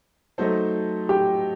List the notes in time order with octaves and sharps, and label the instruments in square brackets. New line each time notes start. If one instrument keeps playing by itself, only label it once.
[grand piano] F#3 A3 D#4 A4 C5
[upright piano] G4